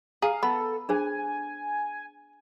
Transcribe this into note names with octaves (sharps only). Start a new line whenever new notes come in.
G#4 F5 A#5
B3 A4 B5
D4 G#4 C5 G#5